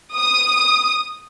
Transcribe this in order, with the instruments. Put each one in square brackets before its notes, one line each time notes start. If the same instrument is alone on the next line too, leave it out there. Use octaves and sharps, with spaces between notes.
[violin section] D#6